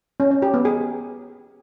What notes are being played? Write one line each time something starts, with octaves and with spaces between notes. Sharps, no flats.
C#4
C#4
G4
B3
G#4